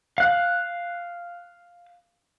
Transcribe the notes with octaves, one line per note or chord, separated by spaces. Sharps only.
F5 F#6